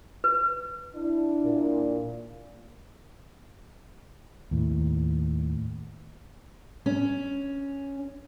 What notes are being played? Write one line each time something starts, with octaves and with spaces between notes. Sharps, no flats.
B4
D4 E4
A#2
D#2 A2
C#4